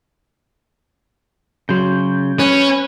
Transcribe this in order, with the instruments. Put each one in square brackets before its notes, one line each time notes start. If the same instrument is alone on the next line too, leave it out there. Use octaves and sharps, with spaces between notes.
[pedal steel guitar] C#3 C6 [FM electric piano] F#3 G6
[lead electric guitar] C#4 [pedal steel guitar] B4